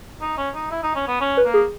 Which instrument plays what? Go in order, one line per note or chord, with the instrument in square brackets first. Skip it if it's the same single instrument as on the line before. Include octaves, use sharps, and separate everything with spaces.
[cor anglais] D#4
C#4
D#4
E4
D#4
C#4
B3
C#4
[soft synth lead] B4
[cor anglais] A#3
[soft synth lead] G#4